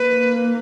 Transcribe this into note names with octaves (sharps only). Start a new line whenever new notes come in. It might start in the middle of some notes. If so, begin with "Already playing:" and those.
Already playing: A#3 B4